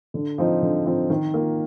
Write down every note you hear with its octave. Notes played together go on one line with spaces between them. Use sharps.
D3
F3 C4 D#4
D3
F3 C4 D#4
D#3
A#3 F4